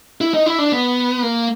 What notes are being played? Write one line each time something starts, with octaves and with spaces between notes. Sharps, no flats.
E4
D#4
E4
D4
B3
A#3